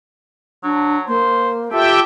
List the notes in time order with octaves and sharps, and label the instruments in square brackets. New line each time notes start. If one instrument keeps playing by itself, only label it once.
[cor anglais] F#3 [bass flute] D4
[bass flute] A#3 [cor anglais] C5
[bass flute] F4 [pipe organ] G4 E5 G5 [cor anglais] A4